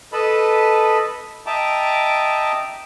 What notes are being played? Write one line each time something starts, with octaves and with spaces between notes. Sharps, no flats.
A4 B4 D#5 A5 B5
D#5 E5 G5 A5 A#5 D6